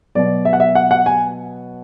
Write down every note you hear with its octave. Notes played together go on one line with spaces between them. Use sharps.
B2 F#3 B3 D5
E5
F#5
E5
F#5
F#5
G#5